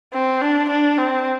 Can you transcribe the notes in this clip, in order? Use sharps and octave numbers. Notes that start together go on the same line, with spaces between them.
C4
D4
D4
C4